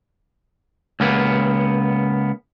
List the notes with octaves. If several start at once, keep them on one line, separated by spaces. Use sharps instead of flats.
C#2 A#3 B3